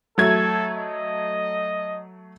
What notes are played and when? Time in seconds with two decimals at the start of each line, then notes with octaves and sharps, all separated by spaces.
0.18 F#3 A3 A4 G#6
0.76 D#5